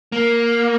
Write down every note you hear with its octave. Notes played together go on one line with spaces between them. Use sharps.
A#3